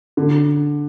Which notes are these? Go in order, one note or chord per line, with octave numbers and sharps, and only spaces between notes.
D3